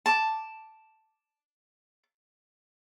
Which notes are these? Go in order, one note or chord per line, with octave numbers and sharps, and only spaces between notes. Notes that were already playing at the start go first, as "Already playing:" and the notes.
A5 D6